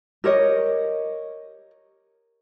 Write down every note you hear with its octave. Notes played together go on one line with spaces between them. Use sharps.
G4 A#4 C#5 D#5